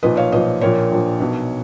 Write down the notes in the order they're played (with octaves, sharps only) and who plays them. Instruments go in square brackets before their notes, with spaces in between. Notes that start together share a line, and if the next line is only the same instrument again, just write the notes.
[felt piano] B1 A#2 F3 B4 D#5
C#5 F5
B1 A#2 F3 B4 D#5
A#1 A#2 F3 A#4 C#5
A#1 A#2 F3
B1 B2